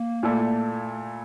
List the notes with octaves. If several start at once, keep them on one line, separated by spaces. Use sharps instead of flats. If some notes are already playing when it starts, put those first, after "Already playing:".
Already playing: A#3
A#2 A3 E4 A4 D5